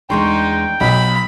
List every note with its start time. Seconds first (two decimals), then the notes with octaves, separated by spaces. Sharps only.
0.10 E2 G#3 D4 D#4 G5 C6 C#6
0.80 B1 F#5 B5